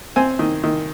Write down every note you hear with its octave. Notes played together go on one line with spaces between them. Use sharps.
C4 G#5
D#3
D#3